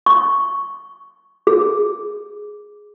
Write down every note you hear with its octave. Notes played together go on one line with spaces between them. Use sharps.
C#6
G#4